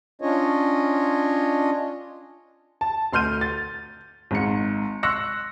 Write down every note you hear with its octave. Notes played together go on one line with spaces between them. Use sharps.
C#4 D4 F4 C#5 D#5
A5
D2 C6 F6 G6 D#7
A6
G#1 G#2 C#7
C6 C#6 E6 F#6 A#6 C#7